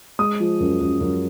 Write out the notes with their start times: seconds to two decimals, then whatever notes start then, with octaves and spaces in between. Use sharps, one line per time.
0.19 G#3 D#6
0.40 F3
0.60 F#2
0.81 F#2
1.01 F#2